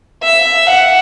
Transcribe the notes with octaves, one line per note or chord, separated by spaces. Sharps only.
E5
F#5